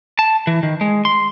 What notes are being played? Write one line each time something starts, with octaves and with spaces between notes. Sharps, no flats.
A5
E3
D#3
G#3
C6